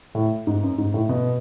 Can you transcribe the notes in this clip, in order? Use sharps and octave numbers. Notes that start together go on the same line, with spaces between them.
A2
G#2
F#2
G#2
A2
B2